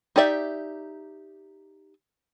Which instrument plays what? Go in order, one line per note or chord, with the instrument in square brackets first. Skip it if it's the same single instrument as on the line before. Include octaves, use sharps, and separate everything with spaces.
[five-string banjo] D#4 G4 D5 E5